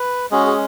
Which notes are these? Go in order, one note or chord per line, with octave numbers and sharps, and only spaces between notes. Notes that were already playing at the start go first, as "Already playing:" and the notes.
Already playing: B4
G#3 C#4 F#4 G#4
G#4